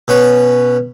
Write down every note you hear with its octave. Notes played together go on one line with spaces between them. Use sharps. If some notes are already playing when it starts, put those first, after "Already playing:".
B2 C#4 B4